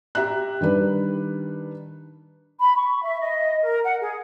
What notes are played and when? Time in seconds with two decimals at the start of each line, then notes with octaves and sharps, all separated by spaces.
0.15 G4 E5 A#5 F#6
0.61 D#3 G3 D4 B4
2.60 B5
2.76 C#6
3.04 E5
3.20 D#5
3.64 A#4
3.83 F#5
4.01 G#4